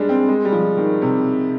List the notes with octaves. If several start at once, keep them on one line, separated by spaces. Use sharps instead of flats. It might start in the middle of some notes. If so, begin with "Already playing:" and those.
Already playing: G3 G#3 D4
C4
G#3
G3
F3
D#3
C3